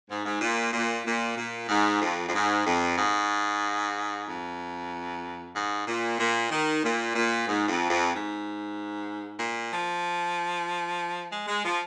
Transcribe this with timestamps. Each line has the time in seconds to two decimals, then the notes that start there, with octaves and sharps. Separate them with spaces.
0.09 G#2
0.25 G#2
0.41 A#2
0.73 A#2
1.05 A#2
1.37 A#2
1.69 G#2
2.02 F2
2.28 F2
2.33 G#2
2.66 F2
2.98 G#2
4.26 F2
5.55 G#2
5.86 A#2
6.19 A#2
6.51 D#3
6.83 A#2
7.15 A#2
7.47 G#2
7.68 F2
7.90 F2
8.11 G#2
9.39 A#2
9.71 F3
11.32 G#3
11.47 G#3
11.64 F3